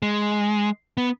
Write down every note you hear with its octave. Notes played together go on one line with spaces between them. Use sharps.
G#3
B3